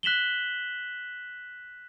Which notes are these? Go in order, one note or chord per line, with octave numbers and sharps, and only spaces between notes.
F#6 B6 E7 F#7 G7